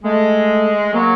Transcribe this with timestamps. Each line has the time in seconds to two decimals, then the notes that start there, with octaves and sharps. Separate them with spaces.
0.03 G#3 A3
0.93 F#3 A#3